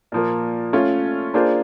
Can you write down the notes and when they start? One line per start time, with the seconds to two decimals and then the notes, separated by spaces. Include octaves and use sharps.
0.12 A#2 F3 A#3
0.73 A3 C#4 F4
1.34 A#3 D4 F4 G#4 C5